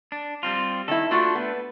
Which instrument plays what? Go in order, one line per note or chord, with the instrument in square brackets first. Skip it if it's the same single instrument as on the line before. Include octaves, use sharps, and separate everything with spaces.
[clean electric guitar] D4
G3 C4 F4
[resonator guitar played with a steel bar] D#3 E4 [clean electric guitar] A4
[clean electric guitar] A3 D4 [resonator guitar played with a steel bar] F4 F#4
[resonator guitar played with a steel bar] B3